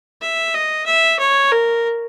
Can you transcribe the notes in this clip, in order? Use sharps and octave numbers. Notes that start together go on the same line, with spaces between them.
E5
D#5
E5
C#5
A#4